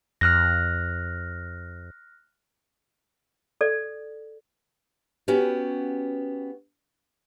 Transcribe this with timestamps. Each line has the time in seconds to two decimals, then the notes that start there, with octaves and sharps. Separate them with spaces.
0.21 F2 F6 F#6 A#6
3.61 A4 D5
5.28 B3 C#4 F#4 G4